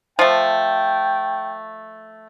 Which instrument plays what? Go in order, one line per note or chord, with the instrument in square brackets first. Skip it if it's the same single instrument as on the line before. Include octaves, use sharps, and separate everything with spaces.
[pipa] F3 A3 [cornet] G5